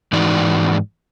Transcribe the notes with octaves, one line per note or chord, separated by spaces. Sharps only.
G#2 E3 D#4 F#4 D5